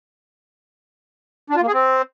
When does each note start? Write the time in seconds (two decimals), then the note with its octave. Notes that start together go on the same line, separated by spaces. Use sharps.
1.50 D4
1.56 F4
1.62 A#3
1.67 G#4
1.73 C4